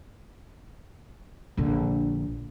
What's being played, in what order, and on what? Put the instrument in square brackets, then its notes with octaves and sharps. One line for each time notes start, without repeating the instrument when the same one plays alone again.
[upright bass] A#1 D3